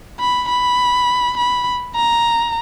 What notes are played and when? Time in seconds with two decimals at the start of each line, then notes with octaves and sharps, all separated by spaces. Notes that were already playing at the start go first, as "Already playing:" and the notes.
0.20 B5
0.49 B5
1.37 B5
1.96 A#5